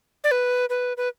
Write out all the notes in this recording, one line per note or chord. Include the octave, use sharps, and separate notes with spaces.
D5
B4
B4
B4